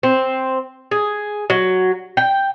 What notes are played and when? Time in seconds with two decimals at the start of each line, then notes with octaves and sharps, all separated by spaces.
0.03 C4
0.91 G#4
1.50 F#3
2.17 G5